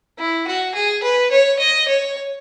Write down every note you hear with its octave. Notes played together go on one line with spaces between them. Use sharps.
E4
F#4
G#4
B4
C#5
D#5
C#5